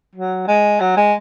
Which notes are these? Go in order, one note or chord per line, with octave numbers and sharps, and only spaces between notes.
F#3
G#3
F#3
G#3